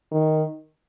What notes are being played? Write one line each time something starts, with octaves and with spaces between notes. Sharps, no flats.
D#3